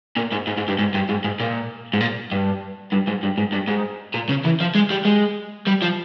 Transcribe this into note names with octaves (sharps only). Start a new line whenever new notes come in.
A#2
G#2
G#2
G#2
G2
G#2
G2
G#2
G#2
A#2
G#2
A#2
G2
G2
G#2
G2
G#2
G2
G#2
A#2
C#3
E3
F3
G#3
G3
G#3
G3
F3